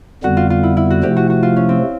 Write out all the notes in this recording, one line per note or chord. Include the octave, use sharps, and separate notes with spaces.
F2 D3 G3 B3 F#4
F4
F4
E4
E4
F#4
C3 F3 A3 G4
F#4
F#4
F4
C#4
C4